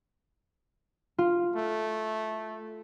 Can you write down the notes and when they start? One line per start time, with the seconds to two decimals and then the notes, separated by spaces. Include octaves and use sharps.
1.18 F4
1.56 A3